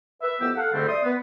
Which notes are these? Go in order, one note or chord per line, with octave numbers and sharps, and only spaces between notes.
B4 E5
F2 E3 B3 G4 E6
A4 F5 F#5
D2 G#2 D3 G3 A3 C4
D5 E5 C6 D#6
B3